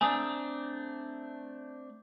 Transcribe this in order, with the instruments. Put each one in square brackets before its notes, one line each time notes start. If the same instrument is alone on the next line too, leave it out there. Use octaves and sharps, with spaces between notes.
[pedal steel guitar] A3 C4 D4 [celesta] G#5 A#5 D#6